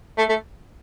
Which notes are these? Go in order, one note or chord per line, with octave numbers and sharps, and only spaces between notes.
A3
A3